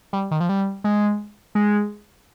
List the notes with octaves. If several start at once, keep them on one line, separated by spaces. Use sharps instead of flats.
G3
D#3
F3
G3
G#3
G#3